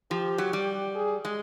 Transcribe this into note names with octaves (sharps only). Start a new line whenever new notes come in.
F3 G4
F#3
G3
G#4
G#3